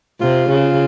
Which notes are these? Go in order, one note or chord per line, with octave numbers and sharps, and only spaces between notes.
C3 F4
C#3